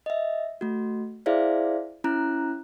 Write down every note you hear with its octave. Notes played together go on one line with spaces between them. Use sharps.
D#5 E5
A3 F#4
E4 G#4 C5 D5 E5 F5
C#4 E4 A#5 F#6